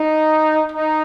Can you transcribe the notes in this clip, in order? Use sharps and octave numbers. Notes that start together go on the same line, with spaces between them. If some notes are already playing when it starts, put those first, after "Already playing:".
Already playing: D#4
D#4